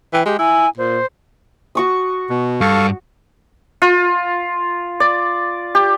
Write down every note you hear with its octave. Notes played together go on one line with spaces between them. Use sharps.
E3 G5
G#3 G4
E4 G#5
A#2 C5
F#4 C#6 D#6
B2
G2 A4 F5 C#6
F4
D5
G4